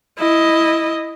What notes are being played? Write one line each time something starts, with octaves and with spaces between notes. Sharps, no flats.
E4 D#5